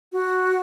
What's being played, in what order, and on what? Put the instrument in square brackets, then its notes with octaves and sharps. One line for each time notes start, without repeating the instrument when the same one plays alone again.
[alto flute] F#4